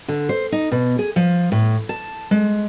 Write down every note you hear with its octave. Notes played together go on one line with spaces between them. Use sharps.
D3
C5
D#4
B2
G#4
F3
A2
A5
G#3